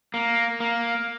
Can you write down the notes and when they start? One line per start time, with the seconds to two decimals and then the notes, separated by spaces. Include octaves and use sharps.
0.14 A#3
0.60 A#3